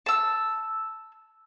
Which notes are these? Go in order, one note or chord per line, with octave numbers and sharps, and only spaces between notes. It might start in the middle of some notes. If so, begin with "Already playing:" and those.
A5 E6